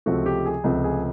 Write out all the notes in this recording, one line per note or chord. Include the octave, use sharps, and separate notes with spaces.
C#2 C3 F3 A3 C4 F#4
G4
G#4
C#2 C3 F3 A3 C4
G#4